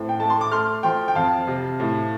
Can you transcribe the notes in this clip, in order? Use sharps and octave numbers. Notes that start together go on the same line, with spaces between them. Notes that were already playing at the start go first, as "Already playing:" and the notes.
Already playing: A2 C4
G5
A3 A5
C6
D6
A3 C6 F6
F3 G5 C6
G5
F2 F5 A5
C3
A2